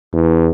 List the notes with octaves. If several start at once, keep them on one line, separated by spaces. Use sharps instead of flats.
E2